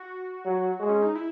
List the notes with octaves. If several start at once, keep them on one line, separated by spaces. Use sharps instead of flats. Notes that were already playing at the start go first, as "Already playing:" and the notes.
Already playing: F#4
F#3
G#3
C#4
D#4
E4